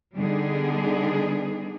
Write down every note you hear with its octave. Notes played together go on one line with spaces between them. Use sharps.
D3 G3 B3 D4 D#4 G#4